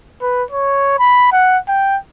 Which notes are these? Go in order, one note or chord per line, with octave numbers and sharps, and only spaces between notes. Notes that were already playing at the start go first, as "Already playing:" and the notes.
B4
C#5
B5
F#5
G5